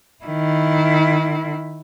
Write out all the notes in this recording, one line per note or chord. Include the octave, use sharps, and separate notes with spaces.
D#3 E4